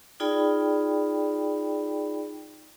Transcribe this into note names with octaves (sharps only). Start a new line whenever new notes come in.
D#4 F4 G#4 D5 G5 B5